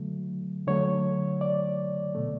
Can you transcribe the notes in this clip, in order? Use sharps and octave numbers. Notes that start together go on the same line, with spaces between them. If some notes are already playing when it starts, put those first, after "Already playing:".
Already playing: D3 F#3 A3
D3 F#3 A3 C#5
D5
B2 A3